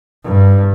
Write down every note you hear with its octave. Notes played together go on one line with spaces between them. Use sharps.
G2